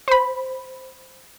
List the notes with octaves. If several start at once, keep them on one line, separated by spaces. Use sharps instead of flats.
C5 B5